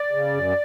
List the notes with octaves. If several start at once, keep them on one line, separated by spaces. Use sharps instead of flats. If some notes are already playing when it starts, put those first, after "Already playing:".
Already playing: D5
C#3
F#2